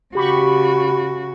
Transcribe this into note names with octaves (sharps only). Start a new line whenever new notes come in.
C#3 F#4 G4 B5 C#6